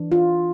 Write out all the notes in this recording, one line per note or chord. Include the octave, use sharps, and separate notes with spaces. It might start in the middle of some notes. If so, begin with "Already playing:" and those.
Already playing: E3 D4
F4